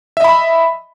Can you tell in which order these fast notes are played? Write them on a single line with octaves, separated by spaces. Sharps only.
E5 D#5 B5